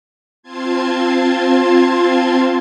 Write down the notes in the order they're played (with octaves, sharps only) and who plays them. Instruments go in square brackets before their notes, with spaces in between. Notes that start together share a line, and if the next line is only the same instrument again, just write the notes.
[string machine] C4 F4 A5 C6 G#6